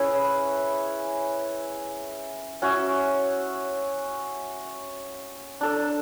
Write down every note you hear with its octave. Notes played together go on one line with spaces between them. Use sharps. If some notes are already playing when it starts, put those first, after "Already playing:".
Already playing: C#4 E4 G#4 B4
C#4 F#4 C#5 E5
D4 A4 D5